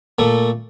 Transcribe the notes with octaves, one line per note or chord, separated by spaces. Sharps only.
A#2 A3